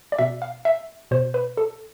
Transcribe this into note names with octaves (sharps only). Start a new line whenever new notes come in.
D5
B2 E5
F5
E5
B2 C5
B4
A4